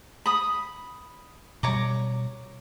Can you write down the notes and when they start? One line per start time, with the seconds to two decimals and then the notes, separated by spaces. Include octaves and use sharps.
0.26 B5 D#6
1.63 B2 G3 C#5 A#5 D6